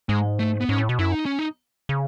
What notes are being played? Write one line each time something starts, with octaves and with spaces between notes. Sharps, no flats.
G#2 G#3
A3
B3
G#2 C#4
A2
B2
F#2 E4
D#4
C#4
D#4
C#3